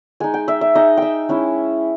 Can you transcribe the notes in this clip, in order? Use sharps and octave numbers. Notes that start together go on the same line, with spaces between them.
G#3 D#4 G#5
G5
E5
E5
G#3 D#4 D#5
E5 G5
G#3 C#4 E4